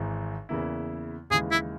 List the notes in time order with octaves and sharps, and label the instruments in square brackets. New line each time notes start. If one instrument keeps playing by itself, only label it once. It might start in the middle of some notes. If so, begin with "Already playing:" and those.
Already playing: [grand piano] G#1 G#2 E3
E2 C#3 E3 A#3 E4
[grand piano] D#2 C#3 E3 G#3 [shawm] G#4
[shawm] E4